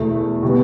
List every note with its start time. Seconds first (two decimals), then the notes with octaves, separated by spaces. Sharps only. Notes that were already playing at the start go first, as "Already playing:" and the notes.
Already playing: E2 B2 A3
0.42 B2 G3 B3 F#4